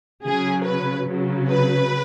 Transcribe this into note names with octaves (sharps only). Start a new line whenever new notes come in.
C#3 F#3 G#4
B4
C#3 F#3
B4